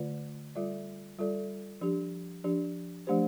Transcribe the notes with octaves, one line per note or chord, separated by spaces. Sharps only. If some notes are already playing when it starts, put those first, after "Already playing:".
Already playing: D3 A3 F4 D5
G3 F4 A4 D5
G3 F4 A4 D5
F3 D4 G4
F3 D4 G4
F3 A3 D4 G4 C5